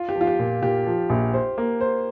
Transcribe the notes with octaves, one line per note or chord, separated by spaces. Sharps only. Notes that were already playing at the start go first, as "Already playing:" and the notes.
Already playing: F4
G4
F3
F4
G4
A#2
A#2 G4
F3
A#1
C5
A#3
C5